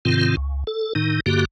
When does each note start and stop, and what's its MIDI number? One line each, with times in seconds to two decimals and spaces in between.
0.05 0.36 44
0.05 0.36 48
0.05 0.36 51
0.05 0.36 60
0.05 0.36 65
0.37 0.64 37
0.67 0.93 69
0.95 1.20 45
0.95 1.20 51
0.95 1.20 63
1.26 1.45 43
1.26 1.45 50
1.26 1.45 58
1.26 1.45 66
1.26 1.45 67